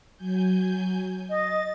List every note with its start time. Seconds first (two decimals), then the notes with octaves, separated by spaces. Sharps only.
0.16 F#3 G#5 G6
1.30 D#5 A6